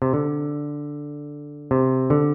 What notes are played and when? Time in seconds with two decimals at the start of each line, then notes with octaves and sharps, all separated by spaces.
0.02 C3
0.13 D3
1.71 C3
2.10 D3